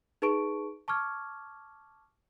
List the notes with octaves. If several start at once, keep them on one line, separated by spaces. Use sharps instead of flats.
D#4 G#4 B4 A5 C#6 D7
A5 C#6 D6 F6 G#6